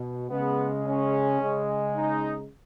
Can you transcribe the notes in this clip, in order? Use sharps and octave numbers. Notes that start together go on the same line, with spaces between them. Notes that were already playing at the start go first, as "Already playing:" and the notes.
Already playing: B2
C#3 G#3 B3
C#4
C#3 G#3
D#4